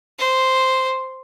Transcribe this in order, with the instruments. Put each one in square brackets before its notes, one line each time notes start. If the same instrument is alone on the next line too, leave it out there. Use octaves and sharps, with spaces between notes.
[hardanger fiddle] C5